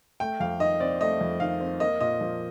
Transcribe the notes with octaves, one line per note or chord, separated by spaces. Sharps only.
A3 G5
F2 F5
D#3 D#5
C4 D5
A3 D#5
F2
D#3 F5
C4
A#3 D#5
A#2 D#5
F3